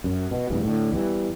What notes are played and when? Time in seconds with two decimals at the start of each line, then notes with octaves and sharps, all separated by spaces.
0.04 F#2
0.31 B2
0.50 F1 E2 G2
0.63 A2 D3
0.92 E2 E3 G3